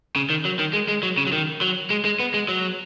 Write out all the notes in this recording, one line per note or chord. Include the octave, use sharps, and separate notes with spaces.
C#3
D#3
F#3
D#3
G#3
G#3
F#3
C#3
F#3
D#3
F#3
G#3
G#3
B3
G#3
F#3